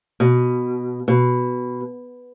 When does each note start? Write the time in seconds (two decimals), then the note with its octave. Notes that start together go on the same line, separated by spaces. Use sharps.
0.20 B2
1.08 B2